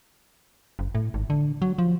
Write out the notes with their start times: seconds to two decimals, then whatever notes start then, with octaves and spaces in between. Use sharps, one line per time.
0.79 F#1
0.95 A2
1.14 G#1
1.30 D3
1.62 F#3
1.78 F3